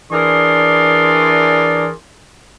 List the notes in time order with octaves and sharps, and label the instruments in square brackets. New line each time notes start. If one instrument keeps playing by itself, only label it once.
[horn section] E3 D4 G#4 A#4 D5 C6